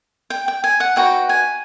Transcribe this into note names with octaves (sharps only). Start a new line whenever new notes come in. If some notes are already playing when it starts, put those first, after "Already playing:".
G5
G5
G#5
F#5
D#4 F#4 B4 G5
G#5